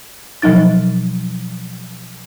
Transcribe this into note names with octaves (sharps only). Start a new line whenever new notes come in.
B2 F3 F#3 D#4 A6